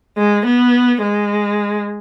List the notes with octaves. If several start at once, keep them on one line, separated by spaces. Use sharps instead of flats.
G#3
B3
G#3